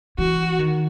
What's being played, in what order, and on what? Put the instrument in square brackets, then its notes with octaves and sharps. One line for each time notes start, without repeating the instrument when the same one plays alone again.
[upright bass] E3 [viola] F#4
[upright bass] D#3